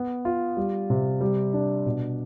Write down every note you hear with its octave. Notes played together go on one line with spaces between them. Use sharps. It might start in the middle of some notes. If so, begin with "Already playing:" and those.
Already playing: B3
F4
G3
C3
G3
D4
B2